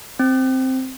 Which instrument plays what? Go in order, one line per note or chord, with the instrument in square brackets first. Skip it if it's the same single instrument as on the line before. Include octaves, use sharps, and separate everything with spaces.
[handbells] C4